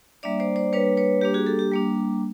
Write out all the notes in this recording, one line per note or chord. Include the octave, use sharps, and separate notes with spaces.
G3 A#3 D4 D5 E5
C5 D5
C5 D5
G3 A#3 D4 B4 C#5
B4 C#5
G3 A#3 D4 G4
F#4 G#4
G4 A4
G4
G3 A#3 D4